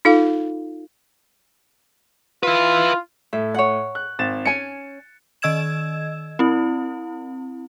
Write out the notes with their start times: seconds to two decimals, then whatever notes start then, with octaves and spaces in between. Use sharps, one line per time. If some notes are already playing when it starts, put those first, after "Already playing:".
0.05 D#4 F4 A4 F5
2.43 E4 F4 B4
3.33 A2 E5
3.54 C#5 F#5
3.95 F#6
4.19 G#1 A6 E7
4.45 C#4 G#5 C#7
5.42 D#3 D#5 E6 G#6 E7
6.39 C4 E4